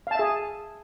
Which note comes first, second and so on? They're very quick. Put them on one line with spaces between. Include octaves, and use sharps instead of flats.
F5 A5 E5 G#4